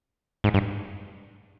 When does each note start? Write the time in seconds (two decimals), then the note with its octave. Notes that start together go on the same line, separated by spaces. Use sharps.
0.44 G#2
0.54 G2